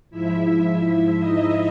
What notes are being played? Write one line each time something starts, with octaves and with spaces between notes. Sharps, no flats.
G#2 F3 E4 E5
E4 E5
E4 E5
D#4 D#5